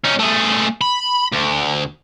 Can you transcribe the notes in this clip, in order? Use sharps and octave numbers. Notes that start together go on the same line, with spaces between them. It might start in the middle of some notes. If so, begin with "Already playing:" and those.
C#4 D#4
A3 G#4
B5
D2